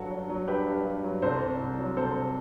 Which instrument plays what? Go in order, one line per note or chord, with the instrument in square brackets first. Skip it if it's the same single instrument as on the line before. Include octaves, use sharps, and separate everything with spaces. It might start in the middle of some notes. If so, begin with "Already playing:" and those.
Already playing: [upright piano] G2 F#3 F#4 A4
F#3
F#3
G2 G4 B4
G2
G2
F#3
C2 A4 C5
C2
C2
F#3
C3 A4 C5